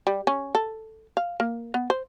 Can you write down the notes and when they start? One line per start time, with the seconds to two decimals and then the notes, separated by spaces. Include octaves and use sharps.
0.07 G3
0.27 C#4
0.55 A4
1.17 F5
1.40 A#3
1.74 B3
1.90 C5